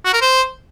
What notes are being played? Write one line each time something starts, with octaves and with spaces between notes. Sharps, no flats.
F#4
A#4
C5